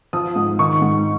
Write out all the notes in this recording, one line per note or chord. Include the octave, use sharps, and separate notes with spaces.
F3 D#6
G#2
D#3 C#6
G#2